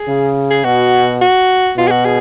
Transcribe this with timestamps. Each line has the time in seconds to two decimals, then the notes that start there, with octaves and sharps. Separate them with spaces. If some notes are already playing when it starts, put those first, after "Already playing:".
Already playing: G#4
0.08 C#3
0.51 G#4
0.65 B2 F#4
1.22 F#4
1.77 B2 F4
1.88 G#4
1.91 F#4
2.05 G#4